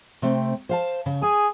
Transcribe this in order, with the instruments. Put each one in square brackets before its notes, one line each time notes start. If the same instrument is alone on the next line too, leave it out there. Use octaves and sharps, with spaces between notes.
[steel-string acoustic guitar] C3 A3 C4
C5 F5 A5
C#3
[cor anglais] G#4 [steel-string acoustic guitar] G#5